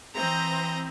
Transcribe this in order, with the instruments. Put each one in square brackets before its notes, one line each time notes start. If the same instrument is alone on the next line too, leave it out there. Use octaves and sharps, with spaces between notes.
[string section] E3 C4 [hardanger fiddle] D#5 A#5